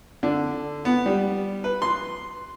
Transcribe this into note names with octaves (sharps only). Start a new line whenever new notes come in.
D3
B3
G3
B4
C6